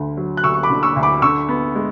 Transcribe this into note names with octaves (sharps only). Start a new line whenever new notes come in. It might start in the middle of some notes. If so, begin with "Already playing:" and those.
Already playing: D2 D3
F#3
F#6
D2 C#6 E6
C#6
B5 D6
D3
C#6 E6
D2
B5 D6
D3 C#6 E6
B3
G#3